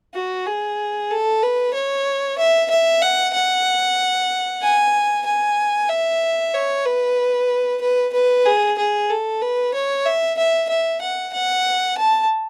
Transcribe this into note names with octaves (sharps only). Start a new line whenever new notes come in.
F#4
G#4
A4
B4
C#5
E5
E5
F#5
F#5
G#5
G#5
E5
C#5
B4
B4
B4
G#4
G#4
A4
B4
C#5
E5
E5
E5
F#5
F#5
A5